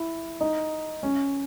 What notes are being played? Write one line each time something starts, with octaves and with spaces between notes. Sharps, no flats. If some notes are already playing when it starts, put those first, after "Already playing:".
Already playing: E4
D#4
C#4